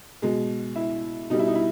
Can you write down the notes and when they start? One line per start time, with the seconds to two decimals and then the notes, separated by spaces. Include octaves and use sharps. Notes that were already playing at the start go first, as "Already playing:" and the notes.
0.22 B2 G#3
0.76 E4
1.30 B2 G3 D#4
1.39 E4
1.48 D#4
1.55 E4